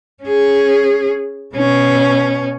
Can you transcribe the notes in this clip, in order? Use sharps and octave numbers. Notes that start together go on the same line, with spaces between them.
C#4 G#4
B2 C#4